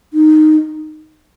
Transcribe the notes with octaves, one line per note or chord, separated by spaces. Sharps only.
D#4